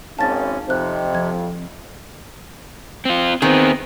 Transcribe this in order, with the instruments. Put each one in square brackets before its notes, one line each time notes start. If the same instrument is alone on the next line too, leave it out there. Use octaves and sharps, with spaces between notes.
[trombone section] G#1 [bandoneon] C#4 [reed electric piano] D#4 F5 [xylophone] A5 A6
[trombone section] F2 [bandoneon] C3 [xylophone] C5 F#6
[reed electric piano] F3 C4 [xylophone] G#6
[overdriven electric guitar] C4 F4
[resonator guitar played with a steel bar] D#3 [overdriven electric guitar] B3 G#4 [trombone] C4